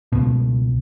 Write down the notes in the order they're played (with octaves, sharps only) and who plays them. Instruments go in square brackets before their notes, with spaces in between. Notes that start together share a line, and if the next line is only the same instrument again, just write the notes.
[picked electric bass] C#2 B2